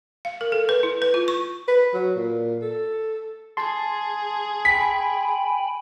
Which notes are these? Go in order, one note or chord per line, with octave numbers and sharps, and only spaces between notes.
F5
A#4
A4
B4
E4
B4
F4
C#6
B4
F#3
A#2
A4
G#4 A5 C6
G5 G#5 B5 B6